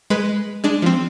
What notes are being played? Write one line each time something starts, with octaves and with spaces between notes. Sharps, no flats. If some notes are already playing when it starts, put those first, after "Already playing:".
G#3 B4
G#3 D4
F3 C4